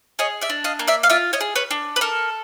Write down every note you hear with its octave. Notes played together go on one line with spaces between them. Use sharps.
G#4 C#5 D#5
D5 E5
D4
D#5 F5
A#3
D5 E5
F5
F4 D5 E5
C#5 D#5
G#4
B4 C#5
D4
B4
A4 A#4